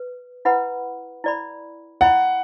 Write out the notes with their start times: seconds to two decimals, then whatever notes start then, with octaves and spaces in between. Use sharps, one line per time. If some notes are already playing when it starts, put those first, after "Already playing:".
Already playing: B4
0.45 E4 B4 F#5 B5
1.24 E4 D5 B5
2.01 E4 D5 F#5 B5